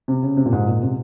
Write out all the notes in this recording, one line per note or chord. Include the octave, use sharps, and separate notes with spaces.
C3
C#3
C3
A#2
G#2
A#2
C3